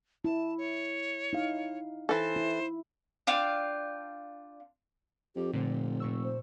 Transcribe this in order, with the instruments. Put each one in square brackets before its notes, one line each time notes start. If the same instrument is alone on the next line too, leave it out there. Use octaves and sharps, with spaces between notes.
[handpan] E4 [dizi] A5
[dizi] C#5
[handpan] D#4 E4 F5
[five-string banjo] E3 A4 [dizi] C5
[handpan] E4
[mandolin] D4 F4 F5 G5
[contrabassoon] F2 [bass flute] G4
[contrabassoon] F1 [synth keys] A#2 D3 [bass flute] C4
[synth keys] A#2 C#6 E6
[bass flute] C5